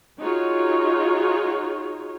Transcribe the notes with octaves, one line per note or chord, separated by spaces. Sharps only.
D#4 F4 F#4 G#4 C#5